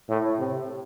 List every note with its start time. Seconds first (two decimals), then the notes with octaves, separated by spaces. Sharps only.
0.09 A2
0.38 C3